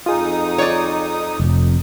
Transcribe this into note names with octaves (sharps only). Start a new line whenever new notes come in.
F2 D#4 F4 G#4 D#6
C#5 D5
F1 F2